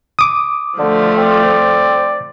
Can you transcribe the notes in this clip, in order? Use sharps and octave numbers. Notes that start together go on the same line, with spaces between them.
D6 D#6
D3 F3 A3
C4 D5